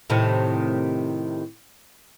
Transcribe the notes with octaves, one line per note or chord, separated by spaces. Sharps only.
A2 C3 D#3